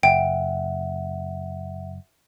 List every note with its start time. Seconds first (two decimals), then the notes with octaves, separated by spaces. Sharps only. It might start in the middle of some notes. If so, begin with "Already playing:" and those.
0.03 F#1 E5 F#5 G5